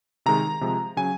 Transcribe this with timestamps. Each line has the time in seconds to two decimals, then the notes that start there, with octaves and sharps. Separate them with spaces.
0.26 C3 D#3 G#3 A#5
0.61 C3 F3 G#3
0.97 C#3 F#3 G#5